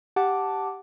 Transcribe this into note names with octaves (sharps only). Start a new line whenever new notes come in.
G4 F#5 A5 D6